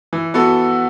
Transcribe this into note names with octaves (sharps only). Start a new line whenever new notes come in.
E3
B3 F#4 A4